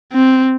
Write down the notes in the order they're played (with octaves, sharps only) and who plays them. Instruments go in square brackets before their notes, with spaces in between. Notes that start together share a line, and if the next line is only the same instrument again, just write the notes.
[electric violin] C4